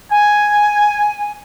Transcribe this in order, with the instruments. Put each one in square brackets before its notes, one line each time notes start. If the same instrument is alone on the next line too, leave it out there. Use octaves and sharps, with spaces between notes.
[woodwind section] G#5